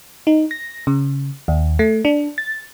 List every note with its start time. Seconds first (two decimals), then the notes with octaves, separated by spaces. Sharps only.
0.27 D#4
0.51 A#6
0.87 C#3
1.48 D#2
1.79 A3
2.05 D4
2.38 A6